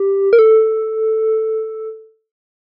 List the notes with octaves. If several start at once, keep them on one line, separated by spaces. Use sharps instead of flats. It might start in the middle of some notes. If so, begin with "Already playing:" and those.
Already playing: G4
A#4
A4